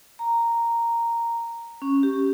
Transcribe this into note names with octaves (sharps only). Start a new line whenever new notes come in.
A#5
C#4
G4